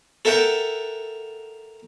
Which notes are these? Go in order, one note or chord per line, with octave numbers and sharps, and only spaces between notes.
A4 A#4 E5 F#5 G5